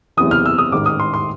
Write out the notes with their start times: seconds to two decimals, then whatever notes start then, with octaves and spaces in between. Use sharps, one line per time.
0.17 F#1 E2 C3 E3 D#6
0.31 F6
0.46 E6
0.58 D#6
0.72 A1 G#2 D#3 D6
0.86 D#6
1.00 C6
1.14 C6